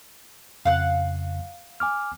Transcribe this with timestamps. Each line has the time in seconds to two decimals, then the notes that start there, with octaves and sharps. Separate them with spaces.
0.65 F2 C#3 F5 F#5 F#6
1.80 G#5 D6 F6